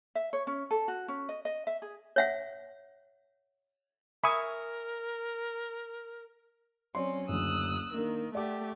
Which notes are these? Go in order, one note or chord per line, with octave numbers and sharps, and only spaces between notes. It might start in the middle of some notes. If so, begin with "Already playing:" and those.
E5
C#5
C#4
A4
F#4
C#4
D#5
D#5
E5
G#4
C#5 E5 F#5
A#4 E5 G#5 B5 C#6 D#6
F#3 C4 C#4 D5 C6
F#1 D2 F#3 D#6 E6 F#6
D#3 A#3 D4 A#4
A3 G4 D5 F#5 D6